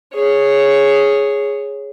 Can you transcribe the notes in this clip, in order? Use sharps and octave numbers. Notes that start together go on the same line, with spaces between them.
G#4 C#5